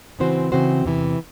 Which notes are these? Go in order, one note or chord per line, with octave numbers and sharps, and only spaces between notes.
C#3 E3 C4 F#4 C5
C#3 E3 C4 F#4 C5
E2 C3 E3